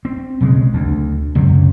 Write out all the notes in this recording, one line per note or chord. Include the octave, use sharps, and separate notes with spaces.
C4
B1 C#3 F#3 G#3
D2
C#2 F#2 C3